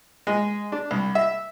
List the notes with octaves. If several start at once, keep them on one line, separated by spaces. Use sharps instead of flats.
G#3
D4
C2
E5